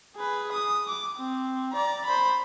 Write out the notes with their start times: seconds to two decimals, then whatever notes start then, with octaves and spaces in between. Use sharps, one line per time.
0.16 G#4 B4
0.52 D#6
0.89 D6
1.17 C4
1.73 D5 A#5
2.06 C5 B5